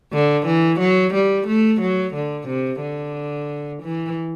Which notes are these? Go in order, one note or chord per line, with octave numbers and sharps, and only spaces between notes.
D3
E3
F#3
G3
A3
F#3
D3
C3
D3
E3